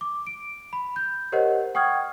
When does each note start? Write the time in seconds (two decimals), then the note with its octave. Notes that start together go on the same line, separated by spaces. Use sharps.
0.01 D6
0.27 D7
0.73 B5
0.96 G6
1.32 G4 A#4 C5 C#5 D#5 F#5
1.74 F#5 G5 C#6 D#6 F6 G#6